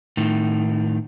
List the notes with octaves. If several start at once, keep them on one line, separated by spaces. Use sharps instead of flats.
A2 D#3